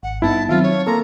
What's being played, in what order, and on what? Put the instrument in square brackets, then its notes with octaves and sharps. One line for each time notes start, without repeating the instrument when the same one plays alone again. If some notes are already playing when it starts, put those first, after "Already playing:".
[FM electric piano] G#1 [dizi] F#5
[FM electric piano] G2 B3 D#4 [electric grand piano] E4 [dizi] A5
[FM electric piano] D#3 F#3 C4 [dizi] F4 [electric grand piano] E5
[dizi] C#5
[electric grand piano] A#3 A4 [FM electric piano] A5 C6 [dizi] A#5